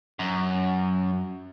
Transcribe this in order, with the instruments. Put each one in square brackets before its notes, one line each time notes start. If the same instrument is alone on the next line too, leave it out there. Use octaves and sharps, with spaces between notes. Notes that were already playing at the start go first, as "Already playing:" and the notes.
[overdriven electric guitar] F#2